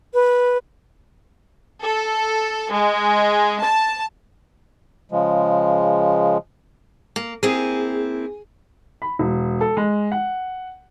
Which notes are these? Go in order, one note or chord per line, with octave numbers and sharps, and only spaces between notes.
B4
A4
G#3
A5
C#3 F3 G#3
A#3
A#3 C4 E4 G#4
B5
E1
A4
G#3
F#5